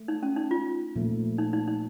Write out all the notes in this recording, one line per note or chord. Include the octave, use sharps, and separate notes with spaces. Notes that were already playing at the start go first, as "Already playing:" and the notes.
Already playing: A3
D#4
C#4
D#4
F4
A#2 F3 A3
D#4
D#4
D#4